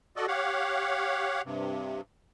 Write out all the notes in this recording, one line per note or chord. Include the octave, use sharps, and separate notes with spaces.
F#4 A4 D5 D#5
G4 C#5 F5 F#5
G2 C3